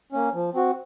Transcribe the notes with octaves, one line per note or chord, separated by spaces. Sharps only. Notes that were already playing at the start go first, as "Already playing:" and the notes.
A#3 C#4
F3
C4 F#4